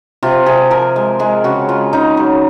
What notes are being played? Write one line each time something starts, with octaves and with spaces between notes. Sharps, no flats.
C3 F4
C3 G#4
F3 A#4
G#3
G#3 G#4
C#3 F#4
G#3 F4
C#3 D#4
F#3